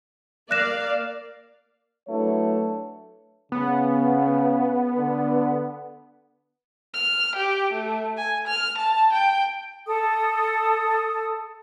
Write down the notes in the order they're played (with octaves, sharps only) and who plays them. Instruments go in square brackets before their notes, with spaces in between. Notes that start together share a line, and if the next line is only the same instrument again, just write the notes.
[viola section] A#3 D5 F5 [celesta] F#6 A#6 E7
[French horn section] F#3 A3 D4 E4 B4 C#5
[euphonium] C#3 [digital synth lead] B3
[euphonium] D3
[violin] F6
G4
A3
G#5
F6
A5
G5
[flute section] A4 D#6